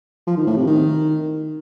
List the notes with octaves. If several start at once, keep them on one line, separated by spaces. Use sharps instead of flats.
F3
D#3
A2
C3
D#3